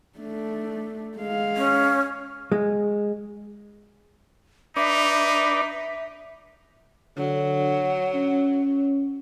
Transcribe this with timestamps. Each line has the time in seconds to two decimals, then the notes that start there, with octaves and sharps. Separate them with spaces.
0.19 A3 D4
1.17 G#3 F5
1.57 C#4
2.52 G#3
4.77 D4 D#4 B4 D5 E5
7.17 D3 F#3
8.15 C#4